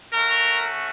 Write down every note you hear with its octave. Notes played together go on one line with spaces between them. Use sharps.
A3 C#4 F#4 A#4